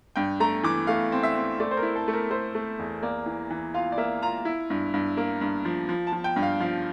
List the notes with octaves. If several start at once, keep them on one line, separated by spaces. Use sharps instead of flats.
G2 G5
A3 A#5
E3 D6
A3 F5
C4
E5
C4
A3 D5
C5
A#4
E4
A4
A3
A#4
A3 C5
A3
E2
A#3 D5
E3
E3
F4 F5
D5
A#3 E5
F4 A#5
E4
G2
G2
A#3
G2
F3
F3
A5
F3
G5
G2
F5
F3 F5